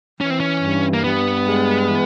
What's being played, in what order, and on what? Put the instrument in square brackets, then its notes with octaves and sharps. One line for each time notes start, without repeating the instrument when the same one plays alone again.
[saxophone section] E3 [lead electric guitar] C#4
[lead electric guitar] C4
C#4
[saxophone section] G2
[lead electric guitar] A#3
[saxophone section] G2 [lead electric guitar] B3
[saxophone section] G#3
E3